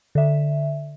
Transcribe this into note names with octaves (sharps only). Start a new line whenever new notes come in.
D3 E5